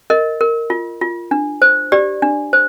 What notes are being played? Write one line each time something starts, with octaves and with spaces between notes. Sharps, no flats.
A#4 D#5
A#4
F4
F4
D4
C5
G4 D5
D4
C5